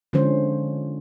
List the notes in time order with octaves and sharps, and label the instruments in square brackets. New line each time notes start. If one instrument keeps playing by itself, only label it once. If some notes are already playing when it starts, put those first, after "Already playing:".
[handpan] D3 F3 G#3 C#4 C5